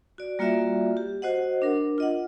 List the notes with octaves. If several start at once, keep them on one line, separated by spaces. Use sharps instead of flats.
F#4 D5
G3 A#3 F4 F#4 D5 E5
G4
F#4 C5 D#5 F#5
D4 A#4
F4 D#5 F#5